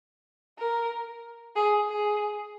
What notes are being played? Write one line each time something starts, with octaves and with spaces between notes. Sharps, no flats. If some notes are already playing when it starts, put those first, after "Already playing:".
A#4
G#4
G#4